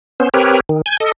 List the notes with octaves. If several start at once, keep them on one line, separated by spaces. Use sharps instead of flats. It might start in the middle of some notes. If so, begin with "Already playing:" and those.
B3 C#4 C5
C4 G4 A#4 B4 C#5
D#3
G#5 G6 G#6
A4 D#5